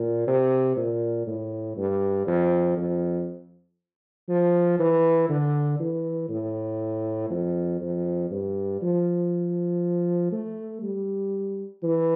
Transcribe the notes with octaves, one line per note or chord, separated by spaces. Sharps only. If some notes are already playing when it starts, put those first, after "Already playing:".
Already playing: A#2
C3
A#2
A2
G2
F2
F2
F3
E3
D3
E3
A2
F2
F2
G2
F3
A3
G3
E3